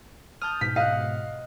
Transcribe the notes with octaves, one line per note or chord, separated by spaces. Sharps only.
A5 D#6 F6 G6
G#2 B2 B6
D#5 F5 F#5